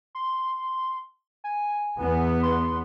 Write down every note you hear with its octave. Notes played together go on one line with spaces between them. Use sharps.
C6
G#5
E2 B3
C6